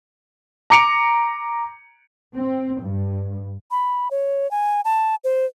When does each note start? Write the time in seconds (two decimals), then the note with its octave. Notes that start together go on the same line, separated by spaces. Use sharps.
0.70 A#5 D6 C#7 D7 F7
2.36 C4
2.82 G2
3.71 B5
4.11 C#5
4.51 G#5
4.85 A5
5.24 C5